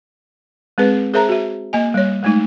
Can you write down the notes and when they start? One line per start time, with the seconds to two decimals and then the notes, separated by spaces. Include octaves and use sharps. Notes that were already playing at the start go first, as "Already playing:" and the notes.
0.78 G#3 C4 G#4 B4
1.14 G#4 A#4 C5 E5 A5 A#5
1.29 F#4 E5
1.73 A#3 D#5 G#5
1.94 G3 C#5
2.23 G#3 A3 D#4